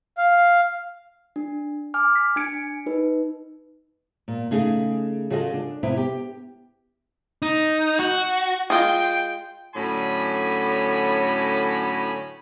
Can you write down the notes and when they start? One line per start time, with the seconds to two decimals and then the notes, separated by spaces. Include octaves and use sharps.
0.18 F5
1.36 D4
1.94 G#5 D6 F6
2.16 B6
2.36 D4 G#5 G#6 C#7 D7
2.86 D#4 B4
4.28 A#2
4.51 C#3 A3 D#4 G#4
5.30 C#3 F4 F#4 G#4 A4 D#5
5.54 D4
5.83 C3 B3 E4
5.97 G4
7.42 D#4
7.99 F#4
8.70 G#3 F4 G#4 G5
9.75 A2 D3 F#3 C#4 G#5 B5